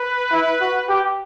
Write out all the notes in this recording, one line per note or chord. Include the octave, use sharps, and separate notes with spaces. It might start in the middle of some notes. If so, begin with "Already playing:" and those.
Already playing: B4
E4
F#4
G4